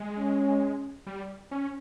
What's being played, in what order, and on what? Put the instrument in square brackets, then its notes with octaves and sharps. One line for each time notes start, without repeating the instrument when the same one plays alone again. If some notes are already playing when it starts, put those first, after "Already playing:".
Already playing: [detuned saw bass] G#3
[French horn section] C#4
[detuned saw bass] G3
C#4